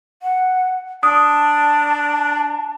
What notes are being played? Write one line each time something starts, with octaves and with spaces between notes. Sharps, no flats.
F#5
D4 A5 D#6